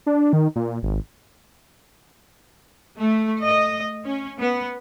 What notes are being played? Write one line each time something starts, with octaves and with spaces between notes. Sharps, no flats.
D4
D#3
A#2
G#1
A3
D#5
C#4
B3